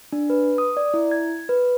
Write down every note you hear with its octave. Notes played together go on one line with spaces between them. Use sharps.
D4
B4
D#6
D5
E4
G#6
B4